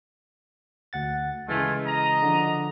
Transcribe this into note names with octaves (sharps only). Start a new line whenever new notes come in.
D2 F#5 A6
C#3 E3 G#3 A3 F4 G#5
D#5 A#5
D3 F3